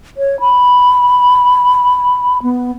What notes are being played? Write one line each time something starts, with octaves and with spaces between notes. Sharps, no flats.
C#5
B5
B3